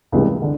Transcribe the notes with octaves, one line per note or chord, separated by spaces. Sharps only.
C#2 C3 E3 G3 A#3
D3